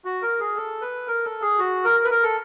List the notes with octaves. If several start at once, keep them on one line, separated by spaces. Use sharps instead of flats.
F#4
A#4
G#4
A4
B4
A#4
A4
G#4
F#4
A#4
B4
A#4
A4